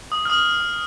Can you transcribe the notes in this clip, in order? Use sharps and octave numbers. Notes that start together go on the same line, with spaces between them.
D#6
F6
D#6